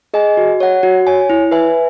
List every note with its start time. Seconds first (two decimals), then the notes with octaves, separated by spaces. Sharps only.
0.14 G#4 D#5 G#5
0.37 F#4
0.60 C#5 F#5
0.83 F#4
1.07 C#5 G#5
1.30 E4
1.51 B4 E5 G#5